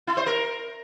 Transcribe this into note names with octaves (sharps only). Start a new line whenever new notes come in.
E4
C5
A#4